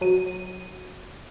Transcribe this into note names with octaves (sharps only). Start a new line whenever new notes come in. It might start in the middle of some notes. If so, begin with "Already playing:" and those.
F#3 D#7